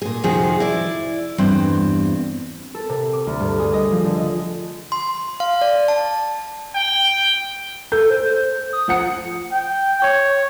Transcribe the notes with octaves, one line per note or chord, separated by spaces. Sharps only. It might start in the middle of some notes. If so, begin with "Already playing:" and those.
A#2 G#4
F2 C3 D#3 F3 F#4 G#4
E4 D5
E2 G2 C4
A4
C3
D6
D2
G2
G#4
D#5
F3
D3
D#5
C6
F5
D5
A5
G5
A4 G6
C5
D#6
F3 F#5 C#7
G5
C#5